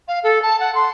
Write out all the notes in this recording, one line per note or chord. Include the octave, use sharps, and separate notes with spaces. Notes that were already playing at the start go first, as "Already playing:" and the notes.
F5
A4
A5
F#5
C6